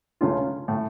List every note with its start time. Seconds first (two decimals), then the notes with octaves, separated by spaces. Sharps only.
0.21 C#2 C#3 A3 C#4 F4
0.68 A2 A3